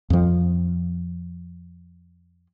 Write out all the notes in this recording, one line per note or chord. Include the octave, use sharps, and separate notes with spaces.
F2 F3